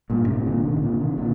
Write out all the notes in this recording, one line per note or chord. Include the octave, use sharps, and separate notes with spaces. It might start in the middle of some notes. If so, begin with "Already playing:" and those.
G2 A#2
A2 C3
A#2 D3
C3 D#3
C3
A#2 D3
C3 D#3
A#2 D3